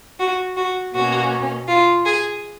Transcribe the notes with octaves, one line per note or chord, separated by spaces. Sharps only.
F#4
F#4
B2 A#3 C#4 F#4
F4
G#4